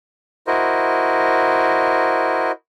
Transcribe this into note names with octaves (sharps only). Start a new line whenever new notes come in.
E4 F#4 A#4 C5 D#5